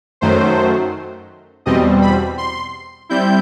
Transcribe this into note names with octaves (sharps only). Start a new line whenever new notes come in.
F#2 D#3 F#3 A3 C5
E2 B2 G3 C4 D#5
B5
C6
G3 C4 E4 G6